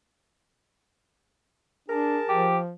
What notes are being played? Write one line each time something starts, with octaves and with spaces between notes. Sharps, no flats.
D4 G#4 A#4 A5
F3 G4